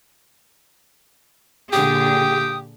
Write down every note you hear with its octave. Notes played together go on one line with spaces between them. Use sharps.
A#2 D3 G4 G#4 G5 D#6